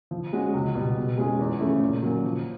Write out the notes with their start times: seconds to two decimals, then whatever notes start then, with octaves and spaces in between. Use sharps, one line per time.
0.11 F3
0.33 G#3 C#4 F#4
0.54 C#2
0.75 B2 G3
0.97 B2
1.18 G#3 C#4 F4 G#4
1.39 E2
1.60 C#3 F3 A3 C#4
1.82 A#2
2.03 F#3 A#3 C#4
2.24 F3